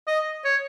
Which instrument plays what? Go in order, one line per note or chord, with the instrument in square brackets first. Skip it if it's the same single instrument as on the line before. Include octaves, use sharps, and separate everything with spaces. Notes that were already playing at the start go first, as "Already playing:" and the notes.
[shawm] D#5
C#5